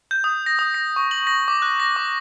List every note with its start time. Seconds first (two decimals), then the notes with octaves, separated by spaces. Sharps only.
0.11 G6
0.24 D#6
0.46 A#6
0.59 D#6
0.74 A#6
0.96 C#6
1.11 F#7
1.27 A#6
1.48 D6
1.62 F#6
1.80 A#6
1.96 D6